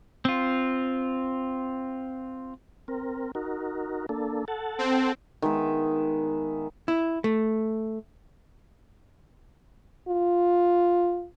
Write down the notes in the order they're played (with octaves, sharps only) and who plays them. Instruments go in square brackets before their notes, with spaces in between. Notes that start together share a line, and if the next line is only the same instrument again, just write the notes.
[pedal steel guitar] C4 F4
[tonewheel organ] C4 A#4
D#4 F#4 A#4
A#3 D4 A4
A4 F#5 A5
[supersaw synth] C4
[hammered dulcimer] D#3 G#3 B3 E5
[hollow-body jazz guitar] E4
A3
[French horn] F4